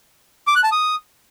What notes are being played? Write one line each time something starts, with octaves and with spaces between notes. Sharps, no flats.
D6
F#6
A5
D#6